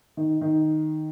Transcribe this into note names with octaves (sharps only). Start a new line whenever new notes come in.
D#3
D#3